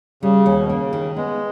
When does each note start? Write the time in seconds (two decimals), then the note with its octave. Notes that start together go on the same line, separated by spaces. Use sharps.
0.23 C#3 G3
0.46 D#2
0.59 B2
0.69 C#3 A#3
0.93 D#3
1.16 G#3 B3